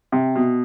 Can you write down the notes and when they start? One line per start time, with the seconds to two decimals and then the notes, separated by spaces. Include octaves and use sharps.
0.12 C3
0.35 B2